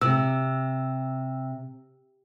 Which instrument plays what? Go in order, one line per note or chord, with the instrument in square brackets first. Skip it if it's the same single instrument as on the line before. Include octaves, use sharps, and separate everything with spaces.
[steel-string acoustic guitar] C3 [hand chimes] E6